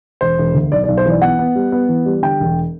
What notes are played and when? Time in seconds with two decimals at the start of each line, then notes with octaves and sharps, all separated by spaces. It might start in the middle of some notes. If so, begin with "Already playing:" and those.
0.21 E1 C5
0.38 E1
0.54 D2
0.72 B1 D5
0.84 D5
0.88 B1
0.98 C5
1.06 E3 D5
1.22 B3 F#5
1.39 B3
1.55 G3
1.72 B3
1.89 E3
2.06 G3
2.22 D3 G5
2.40 E1